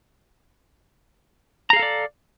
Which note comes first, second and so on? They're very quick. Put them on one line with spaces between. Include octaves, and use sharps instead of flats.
A#5 G#4 F5 A4 D5